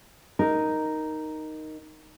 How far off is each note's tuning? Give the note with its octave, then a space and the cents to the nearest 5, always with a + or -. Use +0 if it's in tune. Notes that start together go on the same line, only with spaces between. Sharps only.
D#4 +0 A#4 +0